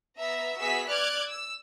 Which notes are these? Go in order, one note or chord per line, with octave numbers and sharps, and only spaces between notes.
B3 E5 A#5
B3 F#4 G#4 E5 E6 B6
D5 D6 F6 F#6 G#6
E6